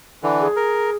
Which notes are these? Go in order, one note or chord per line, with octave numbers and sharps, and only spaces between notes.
D3 E3
G#4
A#4